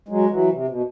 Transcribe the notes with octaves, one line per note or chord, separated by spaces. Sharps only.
F#3 G#3
E3 F#3
C3
B2